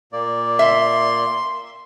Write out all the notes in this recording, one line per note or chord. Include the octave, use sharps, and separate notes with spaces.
A#2 A#3 D5
E5 C6